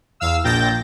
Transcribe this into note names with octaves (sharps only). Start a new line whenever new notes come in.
E2 F5 E6
A#1 A#2 G5 G6 A6 A#6